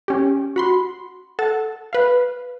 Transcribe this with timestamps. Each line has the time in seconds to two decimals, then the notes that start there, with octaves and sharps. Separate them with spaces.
0.08 C#4 G4
0.56 F#4 B5 C6
1.39 A4 F#5 A6
1.93 B4 F5